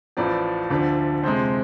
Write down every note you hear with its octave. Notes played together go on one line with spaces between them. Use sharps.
A1 A2 F3 D5
D2 D3 F3
F2 C3 G#3 C5